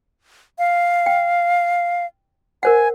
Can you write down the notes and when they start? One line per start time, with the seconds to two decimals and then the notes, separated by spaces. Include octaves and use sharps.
0.59 F5
1.06 G5
2.63 A#4 C5 F#5 G#5